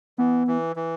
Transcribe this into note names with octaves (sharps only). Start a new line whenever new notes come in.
E3 B3
E3
E3